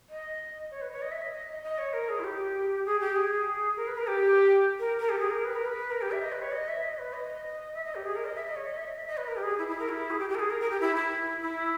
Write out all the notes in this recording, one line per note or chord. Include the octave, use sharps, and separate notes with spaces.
D#5
C#5
B4
C#5
D#5
E5
D#5
D#5
D#5
C#5
A#4
G#4
E4
G4
G#4
G4
G#4
A#4
B4
A#4
G4
A#4
A#4
G4
G#4
A#4
B4
A#4
B4
A#4
G4
E5
D#5
B4
C#5
D#5
E5
D#5
B4
D#5
E5
D#5
G4
G#4
A#4
D#5
E5
D#5
C#5
D#5
E5
D#5
E5
D#5
B4
A#4
G4
G#4
E4
E4
A#4
E4
G#4
G4
G4
A#4
G#4
A#4
A#4
G4
E4
E4
E4